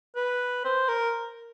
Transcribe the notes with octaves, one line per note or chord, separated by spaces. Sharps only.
B4
C5
A#4